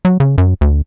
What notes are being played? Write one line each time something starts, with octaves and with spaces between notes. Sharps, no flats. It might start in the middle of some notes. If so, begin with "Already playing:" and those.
F#3
C#3
F#2
D2